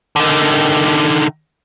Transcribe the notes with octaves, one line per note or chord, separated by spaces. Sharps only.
D3 D#3